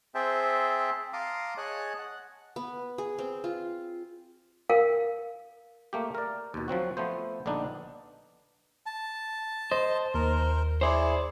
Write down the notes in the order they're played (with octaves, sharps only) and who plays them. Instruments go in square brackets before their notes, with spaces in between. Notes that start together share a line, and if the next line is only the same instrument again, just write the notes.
[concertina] C4 G#4 C5 E5 G5 A5
F5 A5 A#5 C6 D6 D#6
G#4 C#5 D#5 G#5 A5 F#6
F#5
[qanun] B3
G#4
C4
F4
[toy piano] A#4 F5
[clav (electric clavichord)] A3 A#3 G4
A#4 D5
D#2 B2
F3 F#3 C4 F#4
F3 A3 B3 C5
A#1 D3 B3 D4 D#4
[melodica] A5
[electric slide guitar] C5 [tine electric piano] D#5
[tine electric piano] D#2 [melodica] A#4
[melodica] E4 G#4 [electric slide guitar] C5 D5